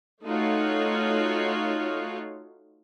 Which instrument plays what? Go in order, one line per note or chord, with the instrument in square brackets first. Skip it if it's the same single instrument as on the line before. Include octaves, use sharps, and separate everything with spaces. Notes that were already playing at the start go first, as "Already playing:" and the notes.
[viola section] A3 D#4 F4 F#4 C#5 F5